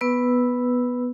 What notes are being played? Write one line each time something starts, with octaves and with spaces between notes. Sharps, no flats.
B3 B4 E6